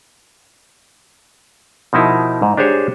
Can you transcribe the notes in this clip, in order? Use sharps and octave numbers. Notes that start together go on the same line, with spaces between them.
B2 F3 D#4 E4 A#4
G#2
D4 G4 G#4 C5 C#5